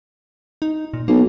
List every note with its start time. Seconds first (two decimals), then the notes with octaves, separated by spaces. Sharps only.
0.62 D#4
0.94 A#2
1.08 B1 A#3